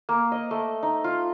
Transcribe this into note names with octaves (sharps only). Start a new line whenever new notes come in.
A#3
D#5
A3
D#4
F4